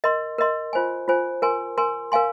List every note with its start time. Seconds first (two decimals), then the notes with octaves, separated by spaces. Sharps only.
0.04 A#4 D#5 C6
0.38 A#4 D#5 C6
0.73 F4 C5 G#5
1.08 F4 C5 G#5
1.42 A#4 G#5 C6
1.78 A#4 G#5 C6
2.12 A#4 F5 G#5 C6